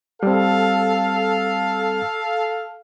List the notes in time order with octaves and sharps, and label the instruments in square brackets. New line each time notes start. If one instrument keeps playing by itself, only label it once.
[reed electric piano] G3 C4 [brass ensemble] A4 F5